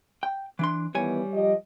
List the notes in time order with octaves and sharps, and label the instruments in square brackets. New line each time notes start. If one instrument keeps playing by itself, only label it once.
[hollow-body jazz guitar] G5
E3 D4 C6
[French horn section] D#3 E3 B3 [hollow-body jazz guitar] G3 C#5 G#5
[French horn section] F3 G4 D#5